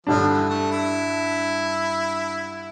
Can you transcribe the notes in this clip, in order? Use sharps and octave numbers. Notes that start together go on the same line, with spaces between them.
G2 D3 F3 G3 D4
E3
A3
E4